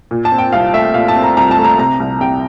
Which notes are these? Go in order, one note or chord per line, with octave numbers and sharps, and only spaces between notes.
A#2
A5
C4
G5
C2 F5
A3 E5
A#2 F5
A5
C4
A#5
C2 A#5
A5
A3
A#5
C3 A#5
C2
C2 G5